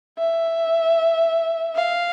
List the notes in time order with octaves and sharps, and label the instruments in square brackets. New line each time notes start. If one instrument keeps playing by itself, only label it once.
[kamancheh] E5
F5